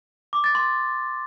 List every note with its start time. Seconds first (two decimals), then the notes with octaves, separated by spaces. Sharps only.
0.33 D6
0.44 A6
0.55 C6